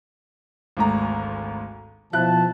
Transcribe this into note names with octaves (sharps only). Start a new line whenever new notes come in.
G#1 D2 A#5
B2 F3 E4 A5 F#6